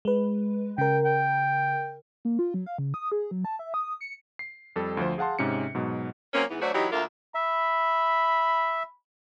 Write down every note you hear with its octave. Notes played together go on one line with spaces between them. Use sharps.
G#3 B4
C#3 A#4 G5
G5
A#3
F4
F#3
F5
C#3
D#6
G#4
F#3
A5
E5
D#6
C#7
C7
F2 G3 A4 E6
D2 F3 C5
G#4 F5 F#5 A5 C6
G#2 C3 C#4 C#7
G#2 B2 F#3
F#3 A#3 C4 C#4
G#2 E3 B3
F#3 A3 D4 F#4 C5 C#5
E3 F#3 D#4 E4 G4 C#5
D2 D3 A#3 F4 A#4 E5
E5 B5